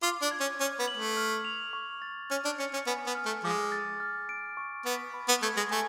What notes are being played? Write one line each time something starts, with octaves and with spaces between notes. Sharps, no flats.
F4 D6
D4
G#6
C#4
C#4 F6
B3
F#7
A3
F6
F7
C#6
A6
C#4 F6
D4
C#4 C#7
C#4
B3 G#5
B3
F6
A3
F3 G#3 D6
A6
F6
D7
C#6
B3 B6
B5
B3
A3 G#6
G#3
A3 G#5